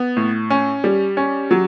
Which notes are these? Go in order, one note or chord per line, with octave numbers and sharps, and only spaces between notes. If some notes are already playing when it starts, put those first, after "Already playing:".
Already playing: B3
A2
C#4
G3
C#4
F#3